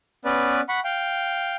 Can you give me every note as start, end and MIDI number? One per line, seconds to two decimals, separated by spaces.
0.25 0.61 59
0.25 0.61 61
0.25 0.61 71
0.25 0.61 74
0.69 0.80 78
0.69 0.80 83
0.69 0.80 85
0.84 1.56 77
0.84 1.56 79